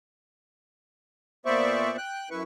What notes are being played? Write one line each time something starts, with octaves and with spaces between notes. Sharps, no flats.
A#2 B3 C5 D5 E5 C#6
G5 F#6
F#2 E4 B4 C#6